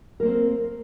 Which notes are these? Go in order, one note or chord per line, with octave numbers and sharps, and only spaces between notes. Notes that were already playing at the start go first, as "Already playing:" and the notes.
A#3 C4 A#4 C5